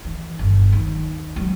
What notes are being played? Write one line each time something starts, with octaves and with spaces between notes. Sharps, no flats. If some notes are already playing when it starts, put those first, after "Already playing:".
E3
G1
D#2
F#3